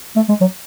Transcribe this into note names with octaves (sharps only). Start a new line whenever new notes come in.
A3
G#3
F#3